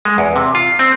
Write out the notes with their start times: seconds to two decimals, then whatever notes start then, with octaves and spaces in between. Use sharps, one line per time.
0.05 G#3
0.18 E2
0.36 C3
0.55 F4
0.79 C4